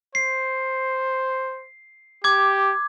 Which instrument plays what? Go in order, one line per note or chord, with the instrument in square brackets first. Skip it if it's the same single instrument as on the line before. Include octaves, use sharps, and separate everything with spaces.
[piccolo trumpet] C5 [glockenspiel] C7
[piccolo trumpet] G4 [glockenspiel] D6 G#6